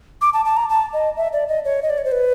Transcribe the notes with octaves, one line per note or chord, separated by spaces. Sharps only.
D6
A5
A5
A#5
A5
D#5
E5
D5
D#5
C#5
D#5
D5
C#5
C5
B4